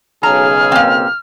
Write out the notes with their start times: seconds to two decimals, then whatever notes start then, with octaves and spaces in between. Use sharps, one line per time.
0.23 B1 C#3 G#4 A#5 F6
0.72 A#3 C4